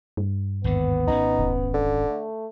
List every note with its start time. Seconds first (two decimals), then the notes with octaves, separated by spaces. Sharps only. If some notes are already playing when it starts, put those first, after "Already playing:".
0.17 G2
0.64 G#1 D#2 D3 B3
1.07 G#1 C4 C#4 D#4
1.38 D#1
1.74 D3
2.09 A3